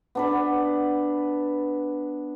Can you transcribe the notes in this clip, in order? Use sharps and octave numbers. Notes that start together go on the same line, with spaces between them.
B3 D4 B4